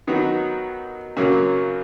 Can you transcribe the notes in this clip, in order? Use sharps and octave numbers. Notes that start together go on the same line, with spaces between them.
D#3 F#3 B3 D#4 F#4
F#2 C#3 F#3 A#3 C#4